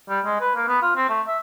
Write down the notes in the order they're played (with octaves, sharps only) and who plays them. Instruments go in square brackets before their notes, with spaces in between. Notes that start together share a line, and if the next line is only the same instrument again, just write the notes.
[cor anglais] G3
G#3
B4
A#3
B3
F4
C4
A3
E5